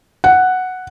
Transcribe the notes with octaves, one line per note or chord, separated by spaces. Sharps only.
F#5